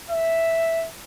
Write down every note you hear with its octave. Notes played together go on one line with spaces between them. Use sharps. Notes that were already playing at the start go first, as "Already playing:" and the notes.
E5